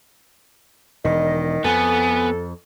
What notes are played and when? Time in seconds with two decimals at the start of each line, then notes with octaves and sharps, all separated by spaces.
1.05 E1 D#3 D#5
1.64 F2 B3 A4 G#5